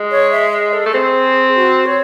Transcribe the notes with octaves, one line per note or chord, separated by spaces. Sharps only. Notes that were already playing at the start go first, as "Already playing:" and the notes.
Already playing: G#3
C#5
E5
D#5
A4
A3
C4 G#4
F#4
C#5